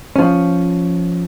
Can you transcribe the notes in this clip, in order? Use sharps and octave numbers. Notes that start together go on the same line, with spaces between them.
F3 C#4